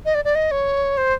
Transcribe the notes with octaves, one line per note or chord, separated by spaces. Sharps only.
D#5
D5
D5
D#5
C#5
C5